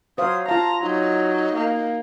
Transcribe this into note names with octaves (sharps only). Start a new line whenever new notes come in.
F#3 C5 F5 D#6
F4 F5 A5 A#5
F#3 D#4
A#3